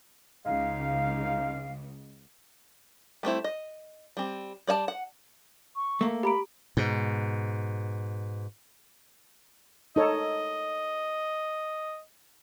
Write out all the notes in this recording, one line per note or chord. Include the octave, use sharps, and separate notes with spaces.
C#2 C#3 G#3 D#4 F5
G3 A3 C4 E4
D#5
G3 C4
G3 D5 E5 A5
F#5
C#6
A3 A#3
G4 A#5 B5 D7
G#2 B2
D#4 A4 C#5 D#5